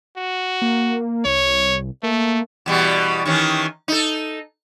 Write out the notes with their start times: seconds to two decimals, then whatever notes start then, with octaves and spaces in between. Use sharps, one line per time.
0.17 F#4
0.62 A#3
1.25 C2 C#5
2.03 A3 A#3
2.66 E2 B2 G3
3.26 D#3 E3 C#4
3.88 D#4 A4